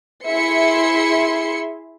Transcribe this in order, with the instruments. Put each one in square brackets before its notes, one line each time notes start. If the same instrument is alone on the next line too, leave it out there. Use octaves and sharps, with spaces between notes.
[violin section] E4 G#4 E5 C6 C#7